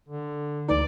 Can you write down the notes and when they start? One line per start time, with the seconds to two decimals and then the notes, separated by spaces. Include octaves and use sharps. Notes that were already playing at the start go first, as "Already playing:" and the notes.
0.08 D3
0.69 D2 E3 D#4 D5